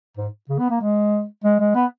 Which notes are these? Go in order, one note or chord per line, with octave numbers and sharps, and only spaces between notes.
G#2
C#3
B3
A#3
G#3
G#3
G#3
B3